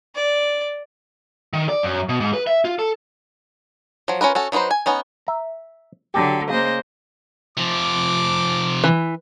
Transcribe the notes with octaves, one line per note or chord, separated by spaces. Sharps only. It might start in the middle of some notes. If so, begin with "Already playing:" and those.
D5
D#3
D5
F#2
B2
G#2
B4
E5
F4
A4
F3 F#3
C#4 F4 A#4 B4
C#4 F#4 A4
F#3 D#4 F4 B4 C5
G#5
B3 C#4 D#4
E5 A#5
D3 F#3 G4 A4
C#3 A#3 C5 D#5
C3 F3 D6
E3